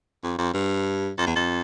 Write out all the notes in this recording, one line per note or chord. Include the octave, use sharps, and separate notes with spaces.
F2
F2
G2
F2
E2
F2